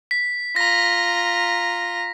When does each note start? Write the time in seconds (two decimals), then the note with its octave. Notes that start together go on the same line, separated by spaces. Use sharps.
0.11 B6
0.56 F4 A#5 A#6